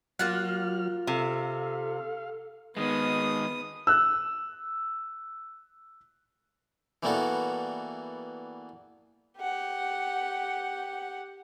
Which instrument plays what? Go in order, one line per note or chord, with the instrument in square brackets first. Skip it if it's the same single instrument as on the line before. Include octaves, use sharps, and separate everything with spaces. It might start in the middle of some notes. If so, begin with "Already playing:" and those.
[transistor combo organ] F#3 F6 [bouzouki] A#3 F4 F#5
[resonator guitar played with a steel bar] C3 [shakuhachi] A4 [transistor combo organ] F5
[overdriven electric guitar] D#3 G#3 [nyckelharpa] B3 D#6
[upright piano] E6 F#6
[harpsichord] E3 G3 A#3 B3 F#4 A4
[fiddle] G4 F#5